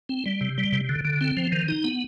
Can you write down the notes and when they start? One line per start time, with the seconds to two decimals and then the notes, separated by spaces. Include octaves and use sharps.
0.09 C4
0.26 G3
0.41 C3
0.58 G3
0.72 C3
0.89 D3
1.05 D3
1.21 C4
1.37 F3
1.52 D#3
1.68 D#4
1.84 B3